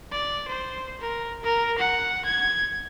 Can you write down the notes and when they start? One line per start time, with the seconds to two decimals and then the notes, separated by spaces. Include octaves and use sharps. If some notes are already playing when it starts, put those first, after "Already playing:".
0.11 D5
0.48 C5
1.01 A#4
1.43 A#4
1.78 F#5
2.25 G#6